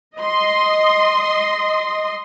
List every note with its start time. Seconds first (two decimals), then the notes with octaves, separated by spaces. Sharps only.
0.16 D#5 C6